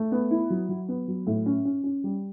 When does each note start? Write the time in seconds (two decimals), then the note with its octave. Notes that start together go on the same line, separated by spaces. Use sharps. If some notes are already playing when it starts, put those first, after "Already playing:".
Already playing: A3
0.12 B3
0.31 E4
0.50 F#3
0.69 F#3
0.89 B3
1.08 F#3
1.27 A2
1.46 C#4
1.65 C#4
1.84 C#4
2.04 G3